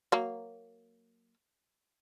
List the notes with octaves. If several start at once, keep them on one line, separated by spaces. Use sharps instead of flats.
F#3 A#3